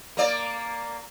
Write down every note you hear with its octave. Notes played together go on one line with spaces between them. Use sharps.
A#3 D5